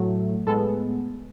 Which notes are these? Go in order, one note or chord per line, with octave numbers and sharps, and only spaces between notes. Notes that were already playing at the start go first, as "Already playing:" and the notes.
Already playing: A2 F#3 A3
A2 G#3 B3 A4